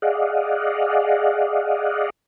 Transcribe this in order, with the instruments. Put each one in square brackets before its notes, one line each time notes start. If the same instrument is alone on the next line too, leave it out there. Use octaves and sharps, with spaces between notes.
[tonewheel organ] G#4 D5 D#5 F5 F#5